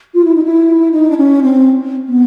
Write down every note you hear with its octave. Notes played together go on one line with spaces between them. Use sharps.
F4
E4
D#4
E4
D#4
D4
C#4
C4
B3